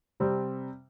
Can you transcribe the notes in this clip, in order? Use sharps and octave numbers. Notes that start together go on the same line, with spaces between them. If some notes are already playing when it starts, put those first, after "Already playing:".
C3 G3 C4